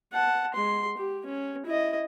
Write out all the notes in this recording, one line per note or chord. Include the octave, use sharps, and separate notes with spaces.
F#5 A5
G#3 C6
G4
C#4
E4 D#5